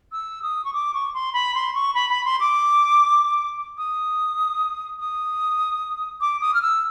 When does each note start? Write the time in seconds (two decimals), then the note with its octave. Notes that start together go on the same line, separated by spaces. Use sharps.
0.12 E6
0.42 D#6
0.65 C#6
0.73 D6
0.94 C#6
1.14 C6
1.34 B5
1.55 C6
1.75 C#6
1.95 B5
2.10 B5
2.25 C6
2.40 D6
3.78 D#6
4.99 D#6
6.21 D6
6.41 D#6
6.54 F6
6.62 E6